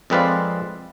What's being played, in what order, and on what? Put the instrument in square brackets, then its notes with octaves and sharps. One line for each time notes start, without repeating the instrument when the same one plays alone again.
[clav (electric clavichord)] F2 G#3 C4 B4 D5 F5